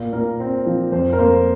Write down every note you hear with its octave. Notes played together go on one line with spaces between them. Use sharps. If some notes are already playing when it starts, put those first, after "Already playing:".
Already playing: A#2
A#2 A#4
C4
F3
F2 C5
A#4
A#3 C5